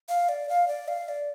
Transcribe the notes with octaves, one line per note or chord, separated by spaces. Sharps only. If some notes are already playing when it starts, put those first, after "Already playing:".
F5
D5
F5
D5
F5
D5